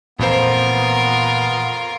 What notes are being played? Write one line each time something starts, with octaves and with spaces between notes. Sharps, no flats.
F2 A#2 E3 F3 B3 F4 A#4 C5